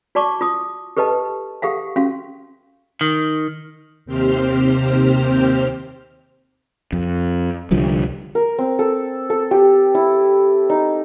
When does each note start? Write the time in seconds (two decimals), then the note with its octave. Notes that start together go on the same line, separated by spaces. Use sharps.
0.15 F#4 D5 A5 C#6 D6
0.41 F4 D#6
0.97 G4 A4 B4 D#5 A5
1.62 G4 A4 F5 F#5
1.96 C#4 F#4 F5
3.01 D#3
4.05 D#2 C3 C4 G4 C5 F6
6.93 F2
7.71 C2 D3 F3 G3
8.35 A#4
8.58 C4
8.79 A4
9.30 A4
9.51 G4
9.94 E4
10.69 D#4